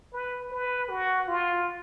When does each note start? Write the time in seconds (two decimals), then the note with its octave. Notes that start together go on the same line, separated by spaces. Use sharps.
0.13 B4
0.51 B4
0.90 F#4
1.28 F4